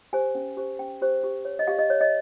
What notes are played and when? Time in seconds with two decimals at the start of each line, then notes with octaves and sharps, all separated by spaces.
0.13 G4 C5 G#5
0.35 C#4
0.57 G4 C5
0.79 C#4 G5
1.02 G4 C5
1.23 G4
1.45 C#5
1.59 D#5
1.67 G4 F5
1.79 D#5
1.90 C#5
2.01 D#5